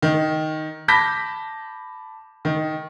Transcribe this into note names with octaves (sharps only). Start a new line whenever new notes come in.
D#3
A5 B5 D6 G6 A#6 B6
D#3